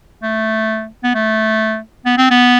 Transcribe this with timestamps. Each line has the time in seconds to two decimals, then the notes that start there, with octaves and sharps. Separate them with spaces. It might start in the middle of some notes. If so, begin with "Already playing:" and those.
0.23 A3
1.04 B3
1.15 A3
2.06 B3
2.18 C4
2.31 B3